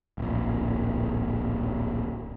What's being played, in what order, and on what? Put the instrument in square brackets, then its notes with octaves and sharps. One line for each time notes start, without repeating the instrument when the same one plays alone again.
[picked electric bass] D1 A#1